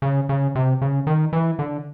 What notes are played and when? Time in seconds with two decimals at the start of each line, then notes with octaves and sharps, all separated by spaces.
0.02 C#3
0.29 C#3
0.55 C3
0.82 C#3
1.07 D#3
1.33 E3
1.59 D3